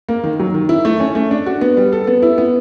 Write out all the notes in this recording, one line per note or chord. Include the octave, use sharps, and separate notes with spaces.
A#3
D#3
F#3
D#3
E4
A3
C#4
A3
D4
F#4
B3
G3
A4
B3
E4
B3